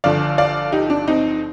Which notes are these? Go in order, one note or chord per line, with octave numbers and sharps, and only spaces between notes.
G1 G2 D3 F3 D5 F5
D5 F5
D#4 G4
D4
C4 D#4